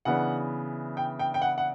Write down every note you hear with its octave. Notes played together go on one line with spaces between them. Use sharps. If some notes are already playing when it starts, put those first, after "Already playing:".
C#3 E3 B3 D4 F#5
G5
G5
G5
F#5
F#5